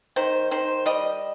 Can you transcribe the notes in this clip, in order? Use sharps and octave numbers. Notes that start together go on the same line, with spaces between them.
D#3 C5
D#3 C5
G3 D#5